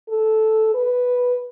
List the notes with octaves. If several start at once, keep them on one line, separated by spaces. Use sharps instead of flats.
A4
B4